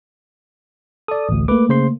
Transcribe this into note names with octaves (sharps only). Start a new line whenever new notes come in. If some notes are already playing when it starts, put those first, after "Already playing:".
A4 D5 D#6
A1 D2
A3 A#3 B4 D6
C#3 C5 C6